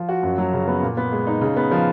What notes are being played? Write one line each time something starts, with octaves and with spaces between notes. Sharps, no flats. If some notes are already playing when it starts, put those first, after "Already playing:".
Already playing: F3
F#4
F#2
F#3
C#3
B3
A#2
B3
G#3
D#4
C#3
B3
F3